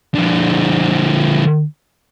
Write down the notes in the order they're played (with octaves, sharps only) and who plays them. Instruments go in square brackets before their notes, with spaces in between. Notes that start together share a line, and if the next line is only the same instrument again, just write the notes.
[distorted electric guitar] D3 F3